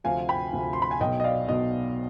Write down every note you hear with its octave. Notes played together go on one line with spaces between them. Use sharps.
D2 C3 F3 F5 G#5
G5 B5
D2 C3 F3
C6
B5
G#5
B1 B2 D#5 G5
D#5
D5 F5
B1 B2 D#5